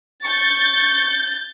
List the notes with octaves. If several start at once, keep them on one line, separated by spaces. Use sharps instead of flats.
C#6 G6 A6